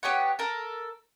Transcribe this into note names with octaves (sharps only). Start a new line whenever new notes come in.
B3 G4 C#5 F#5
A4 A#4